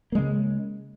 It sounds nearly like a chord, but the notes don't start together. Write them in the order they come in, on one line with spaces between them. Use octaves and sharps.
A#3 G#3 C#3